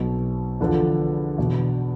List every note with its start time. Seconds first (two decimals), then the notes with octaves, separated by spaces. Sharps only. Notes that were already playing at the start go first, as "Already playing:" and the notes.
Already playing: B1 B2 C4
0.60 E2 D3 F3 D4
1.38 E2 B2